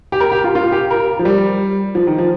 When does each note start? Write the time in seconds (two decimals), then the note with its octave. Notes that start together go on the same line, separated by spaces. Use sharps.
0.12 G4
0.20 A#4
0.32 G4
0.44 F4
0.55 F4
0.72 G4
0.91 A#4
1.19 F3
1.25 G3
1.95 F3
2.07 D#3
2.18 F3